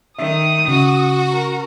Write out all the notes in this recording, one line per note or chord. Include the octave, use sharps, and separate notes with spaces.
D#3 E5 D#6
C#3 F#4
A#4